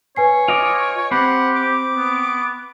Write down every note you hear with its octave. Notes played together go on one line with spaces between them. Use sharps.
B4 C#5 G#5 C7
F4 D#5 D6
C4 G4 F#5 B5
D6
B3